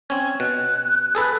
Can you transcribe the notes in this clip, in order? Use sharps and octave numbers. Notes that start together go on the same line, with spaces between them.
C4 C#4 G#6
B2 F#6
G#4 A4 B4